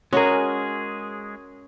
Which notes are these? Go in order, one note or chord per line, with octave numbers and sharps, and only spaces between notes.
G#3 C#4 F#4 G#4 A#4